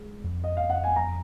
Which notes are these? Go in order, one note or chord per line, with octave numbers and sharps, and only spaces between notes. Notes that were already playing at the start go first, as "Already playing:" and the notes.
Already playing: G#3
F2
D#5
F2 F5
F#5
G#5
F2 A#5